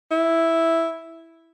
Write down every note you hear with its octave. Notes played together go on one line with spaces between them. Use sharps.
E4